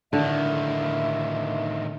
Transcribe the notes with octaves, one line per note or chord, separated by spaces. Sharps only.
A2 D3 D#3 E5